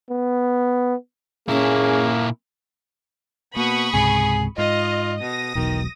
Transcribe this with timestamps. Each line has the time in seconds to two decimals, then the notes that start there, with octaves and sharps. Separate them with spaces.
0.11 B3
1.48 A#2 A#3 C#4 E4 G#4
3.56 B2 A#3 B5 C#6 D#6
3.94 C#2 G#2 C3 G#4
4.58 G#2 F4 D#5
5.20 B2 D#6 A#6
5.55 E1 B1 B2 D#3